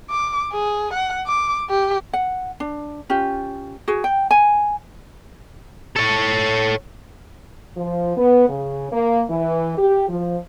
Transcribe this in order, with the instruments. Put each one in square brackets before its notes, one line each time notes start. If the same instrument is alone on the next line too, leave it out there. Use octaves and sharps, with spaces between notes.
[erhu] D6
G#4
F#5
D6
G4
[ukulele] F#5
D4
C#4 F4 G4
F#4 G#4
G5
G#5
[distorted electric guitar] A4 C#5
[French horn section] F3
B3
C#3
A#3
E3
G4
F3